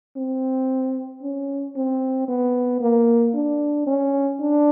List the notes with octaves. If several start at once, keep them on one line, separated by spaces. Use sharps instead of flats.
C4
C#4
C4
B3
A#3
D4
C#4
D4